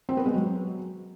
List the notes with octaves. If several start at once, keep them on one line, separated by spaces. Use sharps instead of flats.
C4
B3
G#3
F#3